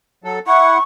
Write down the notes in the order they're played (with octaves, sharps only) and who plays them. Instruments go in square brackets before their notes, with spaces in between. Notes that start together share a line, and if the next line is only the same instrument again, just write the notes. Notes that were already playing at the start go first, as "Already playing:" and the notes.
[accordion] F#3 A4
[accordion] E4 F#5 [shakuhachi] C#6